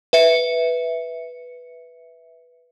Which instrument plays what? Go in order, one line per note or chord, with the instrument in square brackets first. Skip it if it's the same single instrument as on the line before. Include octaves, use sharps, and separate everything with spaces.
[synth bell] B4 E5 C#7